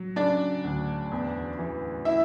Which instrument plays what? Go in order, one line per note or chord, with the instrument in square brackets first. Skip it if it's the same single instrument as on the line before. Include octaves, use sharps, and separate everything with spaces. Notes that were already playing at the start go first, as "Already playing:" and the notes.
Already playing: [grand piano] F#3
[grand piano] C#3 [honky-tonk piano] D4 D5
[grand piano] D2
E2
E3
[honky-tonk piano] E4 E5